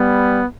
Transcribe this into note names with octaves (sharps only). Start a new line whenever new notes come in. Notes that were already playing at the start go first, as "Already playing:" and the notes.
Already playing: G3 B3